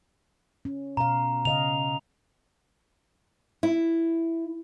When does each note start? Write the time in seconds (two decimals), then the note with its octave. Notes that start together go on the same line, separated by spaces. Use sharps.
0.65 C#4
0.97 B2 F5 A#5
1.45 C#3 D#5 F5 F7
3.63 E4